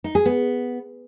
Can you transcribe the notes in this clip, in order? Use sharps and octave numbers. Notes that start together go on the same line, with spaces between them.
D#4
G#4
B3